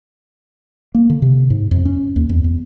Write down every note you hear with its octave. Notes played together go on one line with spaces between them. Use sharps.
A#3
D3
C3
G#2
F2
C#4
D#2
E2
E2